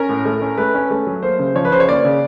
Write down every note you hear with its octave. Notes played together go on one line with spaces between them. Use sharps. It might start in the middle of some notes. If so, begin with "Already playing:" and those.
Already playing: C#4 A#4
A2
A3
C#4
A3 B4
C#4
A3
F#3
A#3 C5
C#3
F3 C#5
B4
C#3 C5
C#5
A#3 D5
C#3